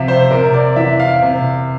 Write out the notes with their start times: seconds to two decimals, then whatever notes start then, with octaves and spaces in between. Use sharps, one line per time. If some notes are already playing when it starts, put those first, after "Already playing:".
Already playing: C3 F3 E5 F5
0.08 C5
0.31 C3 A#4
0.54 D5
0.76 E3 E5
1.00 F5
1.22 C3